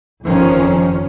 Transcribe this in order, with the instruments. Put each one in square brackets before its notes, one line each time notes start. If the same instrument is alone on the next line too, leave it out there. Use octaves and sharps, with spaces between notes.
[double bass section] G1 F2 D#3 F3 C#4